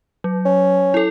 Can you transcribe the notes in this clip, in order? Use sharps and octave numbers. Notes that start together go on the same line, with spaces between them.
F#3
C#4
E4 A4